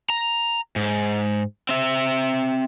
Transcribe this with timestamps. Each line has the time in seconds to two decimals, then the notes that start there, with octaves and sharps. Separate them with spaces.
0.10 A#5
0.76 G#2
1.69 C4 E5